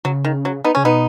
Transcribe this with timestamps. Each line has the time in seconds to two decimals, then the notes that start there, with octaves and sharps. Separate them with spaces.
0.05 C#3 F#3
0.25 D#3
0.45 F#3
0.64 B3 D#4
0.75 C#3 C#4
0.84 B2 B3 D#4